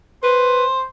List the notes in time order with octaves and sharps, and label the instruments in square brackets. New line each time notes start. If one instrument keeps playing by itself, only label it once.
[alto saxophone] B4 [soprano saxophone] C5